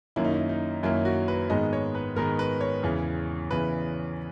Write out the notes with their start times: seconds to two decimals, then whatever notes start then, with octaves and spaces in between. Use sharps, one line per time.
0.16 F#2 D#3 A#3 C#4 E4
0.24 D#4
0.34 E4
0.49 D#4
0.83 F#2 D#3 A#3 C#4 E4
1.05 F#4
1.28 B4
1.50 G#2 D#3 G#3 B3 D#5
1.73 C#5
1.95 B4
2.16 G#2 D#3 G#3 B3 A#4
2.39 B4
2.61 C#5
2.83 E2 C#3 E3
3.51 E2 C#3 E3 B4